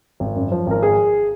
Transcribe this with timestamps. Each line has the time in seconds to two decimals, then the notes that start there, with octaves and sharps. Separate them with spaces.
0.20 G#1
0.35 F#2
0.52 F3
0.67 G#1 A#4
0.83 G#4